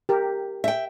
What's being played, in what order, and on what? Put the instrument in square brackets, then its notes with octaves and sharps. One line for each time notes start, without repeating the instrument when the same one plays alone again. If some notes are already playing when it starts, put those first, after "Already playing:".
[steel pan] G4 A#4
[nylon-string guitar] E5 G5